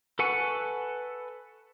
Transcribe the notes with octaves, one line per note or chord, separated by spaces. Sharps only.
A4 B4 F#5 G#5 C#6